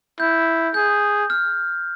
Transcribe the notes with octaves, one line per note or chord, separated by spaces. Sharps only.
E4 G6
G#4 G6
F6